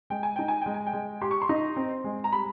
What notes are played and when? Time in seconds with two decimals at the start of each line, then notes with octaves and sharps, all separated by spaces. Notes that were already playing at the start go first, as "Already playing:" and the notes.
0.10 G#3 G5
0.23 G#5
0.36 D#4 G5
0.48 G#5
0.61 G#3 G5
0.74 G#5
0.87 G5
0.93 G#3
1.21 G4 C6
1.31 C#6
1.42 C6
1.49 D#4
1.77 C4
2.04 G#3
2.24 A#5
2.32 G3 B5